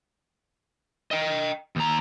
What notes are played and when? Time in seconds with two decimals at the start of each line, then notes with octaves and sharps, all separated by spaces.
1.11 D#5 G5
1.76 D#2 A#5